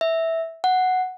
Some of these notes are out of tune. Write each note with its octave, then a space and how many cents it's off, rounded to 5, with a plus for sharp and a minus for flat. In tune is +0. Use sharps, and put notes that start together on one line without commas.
E5 -10
F#5 +0